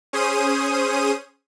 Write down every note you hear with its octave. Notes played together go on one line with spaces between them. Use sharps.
C#4 G#4 C5 D#6 D#7